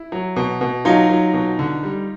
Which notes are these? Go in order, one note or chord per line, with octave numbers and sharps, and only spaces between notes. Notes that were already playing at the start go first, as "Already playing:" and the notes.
Already playing: E4
F#3
B2
B2
F#3 D#4 F4
F#3
B2
D3
G3